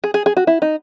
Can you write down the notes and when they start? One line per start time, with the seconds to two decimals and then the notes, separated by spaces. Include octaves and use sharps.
0.04 G#4
0.14 G#4
0.26 G#4
0.37 F#4
0.47 E4
0.62 D#4